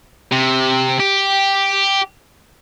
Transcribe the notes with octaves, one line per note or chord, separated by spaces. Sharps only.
C3
G4